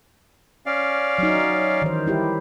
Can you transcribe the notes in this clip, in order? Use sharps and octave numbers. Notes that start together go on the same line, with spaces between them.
C#4 D5 F5
F#3 D#4
D#3 E3 C5
G3 E4 G4